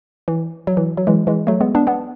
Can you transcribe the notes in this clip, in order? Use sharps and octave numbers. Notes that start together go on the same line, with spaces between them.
E3
F#3
E3
F#3
E3 G#3
E3 G#3
F#3 A3
G#3 B3
B3 D4
B3 D4